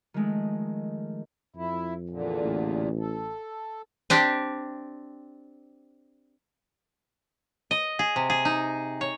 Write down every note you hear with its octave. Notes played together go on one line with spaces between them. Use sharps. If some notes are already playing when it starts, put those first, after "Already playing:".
D#3 F3 G#3 A3
F2 E4
E2 A#2 D3
A1
A4
C4 D4 G4
D#5
G#4
C3
G#4
D#4
C#5